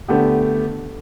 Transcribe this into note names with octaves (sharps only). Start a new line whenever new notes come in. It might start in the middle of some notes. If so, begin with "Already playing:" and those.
D3 A3 B3 G4